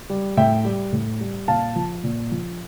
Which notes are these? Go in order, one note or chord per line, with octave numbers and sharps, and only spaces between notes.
G3
A2 E5 G5
G3
A2
G3
A#2 F5 A5
F3
A#2
F3